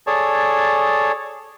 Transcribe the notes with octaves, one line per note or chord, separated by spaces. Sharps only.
G#4 A4 C#5 D5 A5